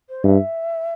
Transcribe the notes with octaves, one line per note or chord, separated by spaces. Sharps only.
C5
G2 E5